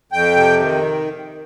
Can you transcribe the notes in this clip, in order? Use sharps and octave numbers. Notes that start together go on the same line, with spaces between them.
F2 G5
C3
D#3